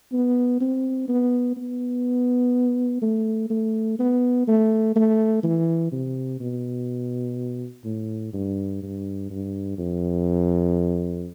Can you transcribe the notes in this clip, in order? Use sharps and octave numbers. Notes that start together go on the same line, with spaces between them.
B3
C4
B3
B3
A3
A3
B3
A3
A3
E3
C3
B2
A2
G2
G2
G2
F2